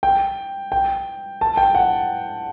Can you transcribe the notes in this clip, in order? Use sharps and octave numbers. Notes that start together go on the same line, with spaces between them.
G5
G5
A5
G5
F#5